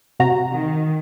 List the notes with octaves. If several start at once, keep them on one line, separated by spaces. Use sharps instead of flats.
C3 F#4 A#5
D#3